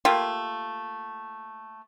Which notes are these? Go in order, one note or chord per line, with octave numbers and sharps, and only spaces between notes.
A3 A#3 F4 G4